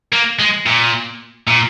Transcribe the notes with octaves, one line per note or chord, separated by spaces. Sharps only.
A#3
G#3
A#2
A#2